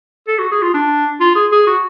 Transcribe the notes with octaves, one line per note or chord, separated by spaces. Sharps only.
A4
F#4
G#4
F4
D4
F4
G#4
G#4
F#4